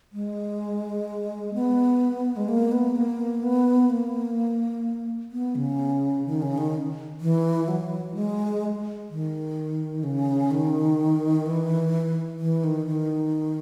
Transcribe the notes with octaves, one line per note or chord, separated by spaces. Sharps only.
G#3
B3
G#3
A#3
B3
A#3
B3
A#3
B3
C#3
D#3
C#3
D#3
E3
F#3
G#3
D#3
C#3
D#3
E3
E3
D#3
D#3